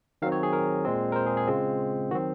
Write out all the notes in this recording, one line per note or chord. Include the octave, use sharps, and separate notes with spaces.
D#3 F#3 C4 F5
C#5
G#4
A#4
A#2 G#3 C4
A#4
C5
G#4
G#4
C#3 G#3 C4 F4
D#3 F#3 C4 F#4